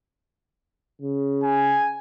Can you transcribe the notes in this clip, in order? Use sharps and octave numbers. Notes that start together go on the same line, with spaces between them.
C#3
G#5